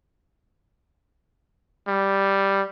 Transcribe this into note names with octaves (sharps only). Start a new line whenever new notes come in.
G3